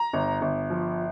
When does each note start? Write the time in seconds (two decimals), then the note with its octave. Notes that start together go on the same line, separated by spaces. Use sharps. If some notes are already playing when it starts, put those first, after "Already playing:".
Already playing: A#5
0.13 G1
0.42 G1
0.70 F3